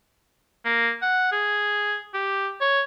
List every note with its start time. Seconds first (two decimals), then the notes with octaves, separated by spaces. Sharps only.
0.65 A#3
1.02 F#5
1.32 G#4
2.14 G4
2.61 C#5